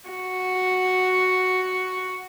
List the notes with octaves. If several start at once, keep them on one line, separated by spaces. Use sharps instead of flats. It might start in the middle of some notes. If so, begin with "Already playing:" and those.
F#4